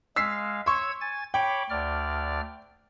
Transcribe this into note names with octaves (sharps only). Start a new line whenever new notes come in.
G#3 F5 E6 B6 C7
C#5 C6 C#6 E6 G#6
G#5 A6
C#5 G5 B5 D6
D2 D5 F6